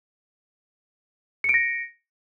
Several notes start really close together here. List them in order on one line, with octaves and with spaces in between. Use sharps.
C#7 D7 A#6